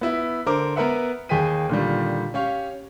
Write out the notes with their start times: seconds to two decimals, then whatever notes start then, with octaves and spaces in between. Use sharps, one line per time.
0.01 B3 E4
0.46 D3 A#4 C5 D6
0.76 B3 A#4 B4 E5 F#5
1.29 D#2 G#4 G5 B6 D#7
1.69 A#2 D3 D#3 G3
2.34 C#4 G4 C#5 F5